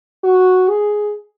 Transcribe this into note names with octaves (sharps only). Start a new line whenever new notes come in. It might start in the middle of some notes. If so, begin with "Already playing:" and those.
F#4
G#4